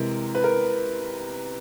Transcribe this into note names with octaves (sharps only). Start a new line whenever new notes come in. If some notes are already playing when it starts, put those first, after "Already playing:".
Already playing: C3 E3 G#3 A#4
B4
A#4